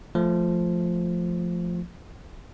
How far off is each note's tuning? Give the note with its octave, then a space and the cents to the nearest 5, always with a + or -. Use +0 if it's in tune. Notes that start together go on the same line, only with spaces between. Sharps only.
F3 +0 A3 +0